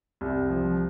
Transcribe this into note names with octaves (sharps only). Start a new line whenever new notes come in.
C2
F3